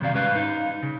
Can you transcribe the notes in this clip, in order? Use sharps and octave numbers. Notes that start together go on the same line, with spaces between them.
F#2 C3 D#3 F#3 D5 F5
G#2 G3 C#4 B4 F5
D#4 F5
C#3